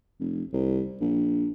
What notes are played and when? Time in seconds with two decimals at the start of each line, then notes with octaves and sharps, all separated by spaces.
0.20 F1
0.53 C2
1.01 A#1